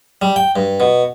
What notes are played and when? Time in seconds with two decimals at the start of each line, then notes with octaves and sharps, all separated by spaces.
0.22 G3
0.36 G5
0.56 G2
0.80 B2